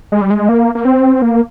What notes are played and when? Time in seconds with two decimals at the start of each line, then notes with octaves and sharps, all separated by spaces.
0.12 G#3
0.21 G3
0.30 G#3
0.49 A#3
0.75 A#3
0.85 C4
1.22 A#3